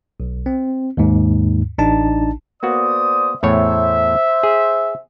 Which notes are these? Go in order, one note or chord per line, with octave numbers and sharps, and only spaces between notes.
B1
C4
D#2 G#2
A1 D4 D#4 A5
A#3 B3 F#4 C5 D5 D#6
E2 A2 C5 C#5 E5
G#4